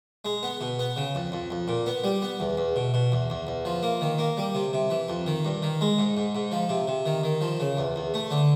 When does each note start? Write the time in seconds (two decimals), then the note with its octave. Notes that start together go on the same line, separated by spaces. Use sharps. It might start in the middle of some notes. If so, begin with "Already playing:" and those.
0.25 G#3
0.43 B3
0.61 B2
0.79 B3
0.96 C#3
1.15 F2
1.32 F2
1.50 F2
1.68 A#2
1.86 B3
2.04 G3
2.22 B3
2.40 E2
2.57 E2
2.76 B2
2.94 B2
3.12 E2
3.30 E2
3.47 E2
3.65 F3
3.83 A#3
4.01 D#3
4.19 A#3
4.37 G3
4.55 C3
4.73 C3
4.90 E3
5.08 F2
5.26 D#3
5.45 G2
5.62 D#3
5.81 G#3
5.98 G#2
6.17 G#2
6.35 G#2
6.52 F3
6.69 C3
6.88 C3
7.06 D#3
7.23 D#3
7.41 F3
7.60 C#3
7.77 E2
7.96 E2
8.14 A3
8.31 D3